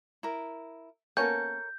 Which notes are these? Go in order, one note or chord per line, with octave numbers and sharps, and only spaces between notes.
E4 A#4
A#3 B3 C#4 A4 A#4 C#5 G6